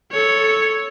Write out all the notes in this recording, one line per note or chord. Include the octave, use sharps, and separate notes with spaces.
A4 C#5